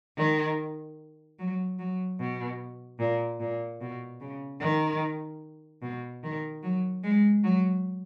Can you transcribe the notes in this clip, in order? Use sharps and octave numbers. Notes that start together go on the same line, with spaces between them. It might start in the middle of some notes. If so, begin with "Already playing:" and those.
D#3
F#3
F#3
B2
A#2
A#2
B2
C#3
D#3
B2
D#3
F#3
G#3
F#3